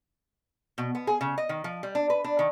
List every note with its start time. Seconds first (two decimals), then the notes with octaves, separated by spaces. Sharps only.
0.78 B2
0.95 B3
1.07 G#4
1.21 C#3
1.38 D#5
1.49 D#3
1.64 F3
1.83 G3
1.95 D4
2.10 B4
2.24 D4
2.39 D#3